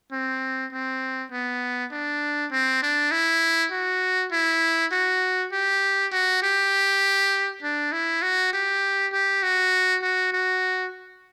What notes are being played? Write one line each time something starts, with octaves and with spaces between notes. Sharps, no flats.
C4
C4
B3
D4
C4
D4
E4
F#4
E4
F#4
G4
F#4
G4
D4
E4
F#4
G4
G4
F#4
F#4
F#4